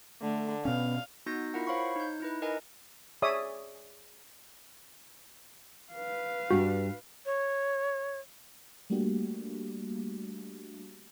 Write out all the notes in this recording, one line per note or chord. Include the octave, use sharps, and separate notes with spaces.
D3 A3
B2 B3 C#4 F5
B3 D#4 F#4 G6 A#6
E4 F4 A#4 F#5
C5 C#5 F5 B5 C#6
D#4 G6
D#4 E4 B4
A#4 B4 D#5 G#5 A#5
G#4 C#5 D5 E5 D#6
B4 F5
G2 G3 D4 F#4
C#5
G3 A3 A#3 D4 F#4 G4